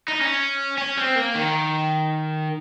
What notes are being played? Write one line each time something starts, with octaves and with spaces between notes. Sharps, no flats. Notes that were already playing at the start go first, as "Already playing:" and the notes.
D#4
C#4
C#4
C4
A#3
D#3